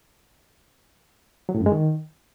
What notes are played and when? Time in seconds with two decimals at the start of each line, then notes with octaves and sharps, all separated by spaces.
1.49 F#3
1.55 A2
1.60 F#2
1.66 G#3
1.72 D#3